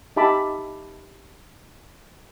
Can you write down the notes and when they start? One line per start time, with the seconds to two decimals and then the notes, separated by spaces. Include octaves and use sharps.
0.16 D#4 G4 E5 A5 B5 D6